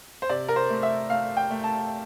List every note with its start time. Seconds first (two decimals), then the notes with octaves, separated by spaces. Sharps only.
0.22 C5
0.29 C3 D5
0.48 A#4
0.56 C5
0.70 A3
0.83 E5
1.10 A3 F5
1.37 G5
1.50 A3
1.64 A5